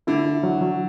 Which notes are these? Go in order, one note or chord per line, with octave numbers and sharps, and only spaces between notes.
D3 E4
E4
F#3
F#3